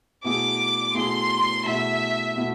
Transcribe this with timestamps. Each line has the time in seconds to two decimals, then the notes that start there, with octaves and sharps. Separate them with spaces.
0.24 B2 A3 E4 G#4 D6
0.95 B2 A3 E4 G#4 C6
1.65 B2 A3 E4 G#4 E5
2.36 B2 A3 E4